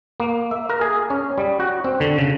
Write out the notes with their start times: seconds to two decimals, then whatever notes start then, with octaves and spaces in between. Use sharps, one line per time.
0.20 A#3
0.51 E5
0.69 A#4
0.81 G#4
1.10 C#4
1.38 G3
1.60 F#4
1.84 C4
2.00 D3
2.18 C#3